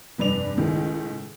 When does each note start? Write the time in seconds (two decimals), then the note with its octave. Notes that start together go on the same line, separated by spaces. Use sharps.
0.18 F1 G2 B4 D5 F7
0.57 C#2 A2 D#3